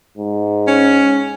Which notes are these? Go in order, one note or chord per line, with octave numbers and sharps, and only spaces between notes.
G#2
C#4